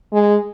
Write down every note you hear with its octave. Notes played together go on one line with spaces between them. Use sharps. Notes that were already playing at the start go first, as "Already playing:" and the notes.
G#3